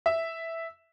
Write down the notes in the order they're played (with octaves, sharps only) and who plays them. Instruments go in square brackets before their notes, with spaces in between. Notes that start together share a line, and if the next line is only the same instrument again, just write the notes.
[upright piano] E5